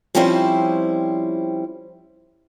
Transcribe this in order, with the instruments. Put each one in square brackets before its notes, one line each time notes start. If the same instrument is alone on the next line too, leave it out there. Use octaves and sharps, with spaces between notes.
[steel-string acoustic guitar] F3 G3 C4 C#4 E4 C5